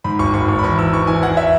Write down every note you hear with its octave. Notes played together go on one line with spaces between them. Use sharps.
G#2 B5
G#1 C#6
G#1 C#6
G#1 C#6
B5
E2 C#6
E3 E6
E3 C#6
E3 G#5
E2 F#5
E5